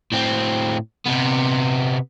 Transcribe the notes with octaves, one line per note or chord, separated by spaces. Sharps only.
A2 C4
C3 B3